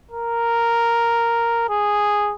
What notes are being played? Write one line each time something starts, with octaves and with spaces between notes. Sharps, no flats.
A#4
G#4